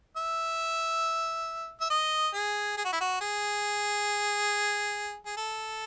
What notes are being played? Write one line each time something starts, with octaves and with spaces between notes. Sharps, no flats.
E5
E5
D#5
G#4
G#4
F#4
E4
F#4
G#4
G#4
A4